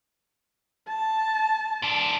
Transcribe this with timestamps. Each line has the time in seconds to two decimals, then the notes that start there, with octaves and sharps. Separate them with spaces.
0.89 A5
1.82 G#2 D4